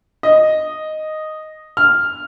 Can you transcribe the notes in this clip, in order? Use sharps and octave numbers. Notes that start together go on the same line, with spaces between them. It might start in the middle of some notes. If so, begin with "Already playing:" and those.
D#5
F6